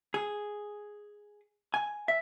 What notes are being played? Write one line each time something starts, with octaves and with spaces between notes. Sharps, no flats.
G#4
G#5
E5